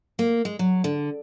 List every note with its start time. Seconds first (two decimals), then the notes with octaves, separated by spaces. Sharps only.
0.19 A#3
0.45 G#3
0.59 F#3
0.84 D3